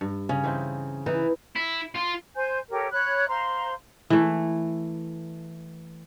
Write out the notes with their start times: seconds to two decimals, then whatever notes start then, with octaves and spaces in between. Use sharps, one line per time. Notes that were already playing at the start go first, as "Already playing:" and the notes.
0.01 G2
0.29 C#3 C#4
0.44 E3 C4 D#4
1.06 E3 D#4
1.56 E4
1.95 F4
2.36 C5 G#5 G6
2.70 G4 A4 A#4 C#5
2.91 C#5 B5 F#6
3.28 C5 F5 A#5 C6
4.10 E3 A3